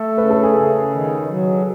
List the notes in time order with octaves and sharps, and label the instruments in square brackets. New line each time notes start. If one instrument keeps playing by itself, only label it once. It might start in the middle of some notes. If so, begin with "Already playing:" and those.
Already playing: [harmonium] A3 [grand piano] A4
[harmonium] C#3 [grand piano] B4
[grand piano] A4
G#4
[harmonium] C#3 [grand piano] A4
[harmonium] D#3
F#3